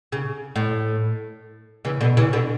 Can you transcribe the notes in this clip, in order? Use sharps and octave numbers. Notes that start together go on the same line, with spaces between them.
C#3
A2
C#3 E3
B2 D3
C#3 E3
B2 D3